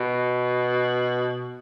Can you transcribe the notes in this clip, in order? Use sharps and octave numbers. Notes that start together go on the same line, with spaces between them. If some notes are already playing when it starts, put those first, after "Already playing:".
Already playing: B2